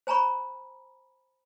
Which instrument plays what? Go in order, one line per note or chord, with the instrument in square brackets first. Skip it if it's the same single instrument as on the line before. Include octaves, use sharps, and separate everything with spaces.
[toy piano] C5 G#5 A#5 B5 C#6